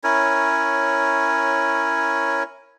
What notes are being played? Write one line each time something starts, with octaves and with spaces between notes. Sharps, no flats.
C#4 E4 A#4 C#5